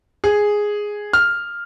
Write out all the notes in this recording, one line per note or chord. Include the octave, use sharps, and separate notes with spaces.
G#4
F6